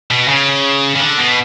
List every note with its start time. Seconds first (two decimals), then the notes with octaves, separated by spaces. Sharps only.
0.11 B2
0.28 C#3
0.95 C#3
1.00 D3
1.18 B2